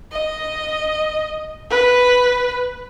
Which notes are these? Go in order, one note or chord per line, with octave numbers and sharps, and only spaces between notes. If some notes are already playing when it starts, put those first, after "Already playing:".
D#5
B4